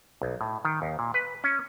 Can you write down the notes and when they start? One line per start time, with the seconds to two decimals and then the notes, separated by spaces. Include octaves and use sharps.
0.22 B1
0.41 A2
0.65 D#3
0.82 D#2
0.99 A#2
1.14 B4
1.44 C#4